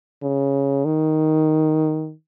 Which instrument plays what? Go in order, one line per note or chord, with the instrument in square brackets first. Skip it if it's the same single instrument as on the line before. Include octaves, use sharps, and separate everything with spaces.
[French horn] C#3
D#3